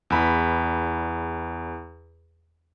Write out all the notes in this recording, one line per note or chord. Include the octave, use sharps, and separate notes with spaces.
E2 B5